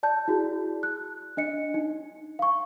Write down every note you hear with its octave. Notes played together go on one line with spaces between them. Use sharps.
D5 A5 G6
E4 F#4 G#4
F#6
D4 D#5 C#7
D#4
F5 C#6